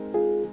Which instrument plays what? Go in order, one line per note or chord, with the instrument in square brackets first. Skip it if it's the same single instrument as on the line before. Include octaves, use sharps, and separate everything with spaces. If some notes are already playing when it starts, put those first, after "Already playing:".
Already playing: [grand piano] G#3 C4 D#4 A#4
[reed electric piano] F4 G#4